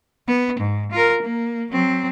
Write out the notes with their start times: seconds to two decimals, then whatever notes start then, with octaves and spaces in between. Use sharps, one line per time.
0.27 B3
0.59 G#2
0.92 F4 A#4
1.23 A#3
1.71 F#3 C4